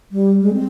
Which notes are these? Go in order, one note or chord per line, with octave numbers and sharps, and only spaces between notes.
G3
G#3
C4